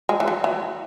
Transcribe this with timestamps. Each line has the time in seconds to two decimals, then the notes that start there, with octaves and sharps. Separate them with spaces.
0.09 G#3
0.20 E3
0.28 F#3
0.44 E3